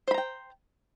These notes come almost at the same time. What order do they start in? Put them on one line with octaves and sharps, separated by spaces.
C5 B5 A#5 G5